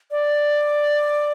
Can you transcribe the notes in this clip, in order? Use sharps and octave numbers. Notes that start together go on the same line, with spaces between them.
D5